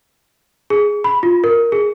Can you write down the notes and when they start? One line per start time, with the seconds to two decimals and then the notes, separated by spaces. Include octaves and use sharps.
0.70 G#4
1.04 B5
1.23 F4
1.44 A#4
1.72 G#4